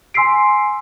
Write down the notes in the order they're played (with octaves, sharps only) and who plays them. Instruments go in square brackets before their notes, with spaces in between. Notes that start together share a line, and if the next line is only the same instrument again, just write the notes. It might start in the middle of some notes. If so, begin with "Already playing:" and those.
[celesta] G#5 C6 E6 B6 C7 D7